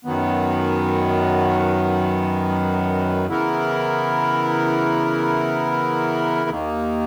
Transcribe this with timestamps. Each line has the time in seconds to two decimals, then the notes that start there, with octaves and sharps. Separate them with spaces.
0.05 F#2 D#3 F#3 B3
3.27 C#3 E3 B3 E4 A#4
6.50 D#2 D#3 A#3